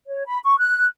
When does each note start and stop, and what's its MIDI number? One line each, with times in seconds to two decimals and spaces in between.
0.08 0.24 73
0.26 0.39 83
0.45 0.57 85
0.59 0.86 90